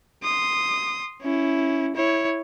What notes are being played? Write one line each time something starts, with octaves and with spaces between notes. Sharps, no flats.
C6 D#6
C#4 E4
E4 C#5